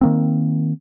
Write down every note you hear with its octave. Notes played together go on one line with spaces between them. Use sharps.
D#3 A#3 C4